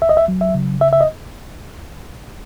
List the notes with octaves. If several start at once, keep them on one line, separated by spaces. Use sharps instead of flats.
C#2 E5
D#5
E5
F#3
E5
C#3
C#2 E5
E5
D#5